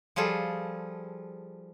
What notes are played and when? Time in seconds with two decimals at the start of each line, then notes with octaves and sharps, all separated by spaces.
0.16 F3 G3 F4 G#4 A4